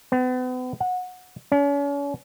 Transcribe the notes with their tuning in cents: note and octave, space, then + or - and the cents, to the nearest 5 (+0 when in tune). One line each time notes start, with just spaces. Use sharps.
B3 +40
F#5 -20
C#4 +40